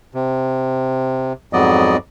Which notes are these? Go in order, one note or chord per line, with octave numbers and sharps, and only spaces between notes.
C3
F2 G#2 F#3 B3 D5 D#5